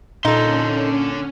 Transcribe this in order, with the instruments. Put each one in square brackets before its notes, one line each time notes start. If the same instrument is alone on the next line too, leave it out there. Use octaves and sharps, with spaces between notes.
[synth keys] A#2 [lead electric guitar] D3 C6 [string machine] C#4 [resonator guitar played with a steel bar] D#4 A4